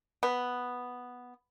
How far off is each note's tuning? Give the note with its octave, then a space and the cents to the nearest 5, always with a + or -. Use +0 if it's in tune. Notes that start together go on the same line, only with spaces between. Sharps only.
B3 +0